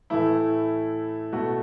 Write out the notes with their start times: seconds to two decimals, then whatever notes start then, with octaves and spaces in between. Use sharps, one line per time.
0.10 A2 E3 A3 E4
1.32 B2 A3 F#4